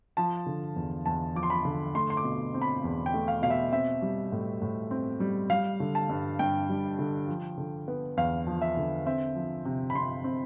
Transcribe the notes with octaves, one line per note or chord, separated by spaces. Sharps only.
F3 A5
D3
E2
E2 A5
F3 D6
C6
B5
D3
A3 C6
C6
D6
B2
C4
B5
E2
G5
A3
F5
B2 F5
E5
C4 E5
G3
A2
A2
C4
G3
G3 F5
D3
A5
G2
G2 G5
G3
D3
F3
D3
B3
E2 F5
F3
E5
D3
C4 E5
F3
C3
B5
C3 C6
C4